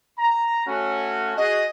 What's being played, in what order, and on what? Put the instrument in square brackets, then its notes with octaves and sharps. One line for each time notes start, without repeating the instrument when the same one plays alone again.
[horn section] A#5
A3 C#4 F#4
[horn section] F#4 G#4 [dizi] D#5